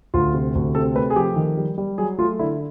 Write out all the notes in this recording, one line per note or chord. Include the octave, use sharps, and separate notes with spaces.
D2 F4
C3
D2
C3 A4
A3 B4
G#4
F3 G4
D#3
G3
G3
F#3 G#4
A3 F4
D3 E4